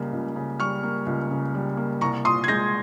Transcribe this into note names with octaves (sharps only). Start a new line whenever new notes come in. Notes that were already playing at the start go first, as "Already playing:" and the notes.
Already playing: C#2 C#3 G3 A#3
C#2
C#3
G3 C#6 F6
A#3
C#2
C#3
G3
A#3
C2 A#5 C#6
A#2 C6 D#6
G#6
G#3 G6 A#6